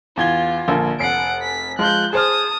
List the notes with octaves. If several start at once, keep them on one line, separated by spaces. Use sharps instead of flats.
E2 F4 G#6 G7
A#1 D3 A#3
F1 F#5 C7 D7
B6
F3 G#3 F4 F#6 G6
G#4 C5 A5 D#6 F6